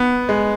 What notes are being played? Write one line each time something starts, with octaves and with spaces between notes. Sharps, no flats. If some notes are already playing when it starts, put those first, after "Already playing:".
Already playing: B3
G#3